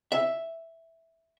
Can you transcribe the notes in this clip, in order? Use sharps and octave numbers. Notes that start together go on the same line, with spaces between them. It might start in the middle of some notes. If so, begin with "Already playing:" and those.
E5